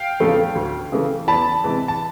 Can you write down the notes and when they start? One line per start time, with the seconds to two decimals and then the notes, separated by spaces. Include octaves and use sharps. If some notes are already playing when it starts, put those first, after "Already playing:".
Already playing: F5 G5
0.20 E2 C#3 F3 A3
0.55 D2
0.92 C#3 E3 A3
1.28 E2 A5 B5
1.64 C3 E3 G#3
1.88 A5